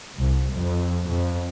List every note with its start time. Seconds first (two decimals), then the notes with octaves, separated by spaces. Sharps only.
0.18 C2
0.54 F2
1.09 F2